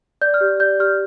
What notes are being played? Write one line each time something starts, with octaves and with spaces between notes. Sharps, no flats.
D5 G6
F6
G4
D5 G6
G4 F6